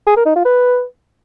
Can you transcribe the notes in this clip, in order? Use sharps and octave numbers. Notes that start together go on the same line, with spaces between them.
G#4
A#4
D#4
F4
B4